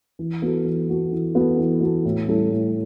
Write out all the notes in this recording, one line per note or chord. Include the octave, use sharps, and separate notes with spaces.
E3
B3 F#4 A4
E3
B3 F#4 A4
E3
B3 F#4 A4
E3
B3 F#4 A4
A2
G3 C#4 E4 A4
A2